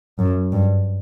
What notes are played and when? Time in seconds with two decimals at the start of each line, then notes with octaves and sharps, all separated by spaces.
0.19 F#2
0.52 G2